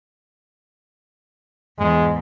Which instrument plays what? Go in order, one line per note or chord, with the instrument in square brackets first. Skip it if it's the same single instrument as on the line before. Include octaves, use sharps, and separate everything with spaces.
[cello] E2 G#2 [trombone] G#3